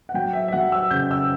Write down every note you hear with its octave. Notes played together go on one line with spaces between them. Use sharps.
F#5
F#3 G5
E5
E5
F#3 F#5
E6
C#3 G6
E6